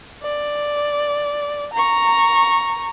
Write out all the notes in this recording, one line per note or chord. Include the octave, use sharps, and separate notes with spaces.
D5
A#5 C#6